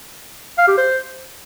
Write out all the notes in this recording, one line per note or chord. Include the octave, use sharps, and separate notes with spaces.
F5
G4
C5